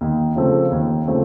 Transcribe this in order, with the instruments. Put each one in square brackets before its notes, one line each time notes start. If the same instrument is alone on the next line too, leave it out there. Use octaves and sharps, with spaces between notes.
[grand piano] D#2
C#3 F3 A3 C4
D#2
C#3 F3 A3 C4